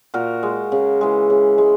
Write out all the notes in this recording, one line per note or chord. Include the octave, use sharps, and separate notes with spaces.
A#2 F#4 A#4
G#3
C#3
E3 G#3
C#3
G#3